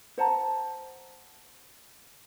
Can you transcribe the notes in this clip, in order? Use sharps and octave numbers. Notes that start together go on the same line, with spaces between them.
C5 F#5 A5 A#5